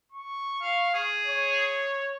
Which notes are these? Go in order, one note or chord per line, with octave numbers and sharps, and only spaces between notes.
C#6
F5
G#4
C#5